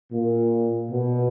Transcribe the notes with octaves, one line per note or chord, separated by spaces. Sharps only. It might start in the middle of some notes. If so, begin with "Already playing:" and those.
A#2
B2